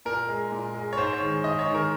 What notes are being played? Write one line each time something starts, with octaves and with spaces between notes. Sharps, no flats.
A#2 A#4
G#3
A#2
G#3
C#5
G#2 C5
C#5
D#3 G#3
G#2 D#5
C#5
D#3 G#3
A#4